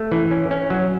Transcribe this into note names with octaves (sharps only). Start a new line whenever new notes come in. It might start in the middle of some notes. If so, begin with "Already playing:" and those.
Already playing: A3
E3
C#4
C#4
F#3